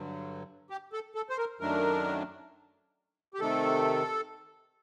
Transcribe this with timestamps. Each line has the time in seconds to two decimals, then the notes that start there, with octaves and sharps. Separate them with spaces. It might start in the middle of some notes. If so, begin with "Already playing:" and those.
Already playing: G2 D3 F#3
0.70 G4
0.93 A4
1.15 A4
1.30 C5
1.38 A#4
1.60 F#2 D#3 F#3 A3 D4 A#4
3.34 G4
3.40 C3 D#3 A3 A4